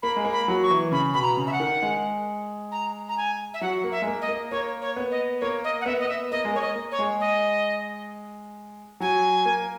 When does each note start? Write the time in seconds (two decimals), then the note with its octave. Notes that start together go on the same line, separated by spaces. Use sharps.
0.03 A#3 B5
0.16 G#3
0.25 A#3
0.33 B5
0.48 F#3
0.63 C#6
0.70 E3
0.92 C#3 B5
1.14 B2 B5
1.22 A#5
1.37 C#3
1.47 E5
1.53 F#5
1.60 D#3
1.82 G#3
2.72 A#5
3.09 A#5
3.17 G#5
3.54 E5
3.61 F#3 F#5
3.84 A#3
3.92 E5
4.02 G#3
4.07 A#3
4.22 D#5
4.29 A#3
4.51 A#3 C#5
4.82 C#5
4.96 B3
5.11 D#5
5.41 A#3 C#5
5.64 D#5
5.81 F#5
5.86 B3 E5
6.00 D#5
6.05 B3 E5
6.31 A#3 D#5
6.45 G#3
6.53 A#3 C#5
6.61 D#5
6.76 A#3
6.92 C#5
6.99 G#3
7.20 D#5
9.00 F#3 G#5
9.45 A#3